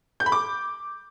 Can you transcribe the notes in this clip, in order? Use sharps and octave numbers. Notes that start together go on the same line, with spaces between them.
G6
B5
D6